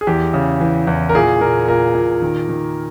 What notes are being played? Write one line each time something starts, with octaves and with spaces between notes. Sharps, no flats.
G#4
E2 G4
C#3
E3
E2
A#4
A#2 G#4
A#2 A#4
A#2 A#4
A#2
D#3
D#3